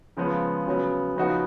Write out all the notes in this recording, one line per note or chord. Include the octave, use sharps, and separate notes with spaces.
C#3 F3 G#3 B3
C#3 F#3 B3
C#3 F3 B3 D#4 F#4